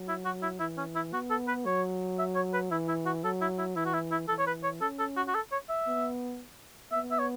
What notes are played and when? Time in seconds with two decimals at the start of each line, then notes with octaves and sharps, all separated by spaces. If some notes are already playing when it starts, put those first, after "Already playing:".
Already playing: F#3
0.08 E4
0.25 F#4
0.43 E4
0.60 E3 E4
0.78 C#4
0.95 E4
1.13 B3 F#4
1.30 A4
1.48 B4
1.66 F#3 C#5
2.19 E5
2.35 C#5
2.53 B4
2.71 E3 E4
2.88 E4
3.06 F#4
3.24 F#3 A4
3.41 E4
3.59 E4
3.76 E3 E4
3.86 F#4
3.94 E4
4.11 E4
4.28 E3 A4
4.39 C#5
4.47 B4
4.63 C#5
4.81 C#4 A4
4.99 A4
5.16 F#4
5.28 F#4
5.35 A4
5.52 C#5
5.69 E5
5.87 B3
6.92 B3 E5
7.11 E5
7.19 C#5